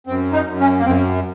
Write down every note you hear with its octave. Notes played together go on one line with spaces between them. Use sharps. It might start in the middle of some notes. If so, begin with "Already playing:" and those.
F#2 C4
D#4
F#2
C#4
A#3
F#2 C4